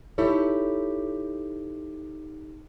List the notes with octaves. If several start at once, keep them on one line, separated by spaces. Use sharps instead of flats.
D#4 E4 G4 A4 C#5